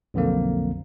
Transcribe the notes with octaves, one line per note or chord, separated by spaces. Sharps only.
B1 F2 D3 A#3